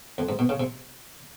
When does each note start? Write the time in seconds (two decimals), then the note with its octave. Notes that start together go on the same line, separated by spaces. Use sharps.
0.18 F2
0.29 G#2
0.39 B2
0.49 C#3
0.60 C3